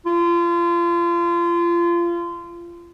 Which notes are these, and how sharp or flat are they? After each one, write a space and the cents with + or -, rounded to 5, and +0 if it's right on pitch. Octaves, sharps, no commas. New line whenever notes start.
F4 -30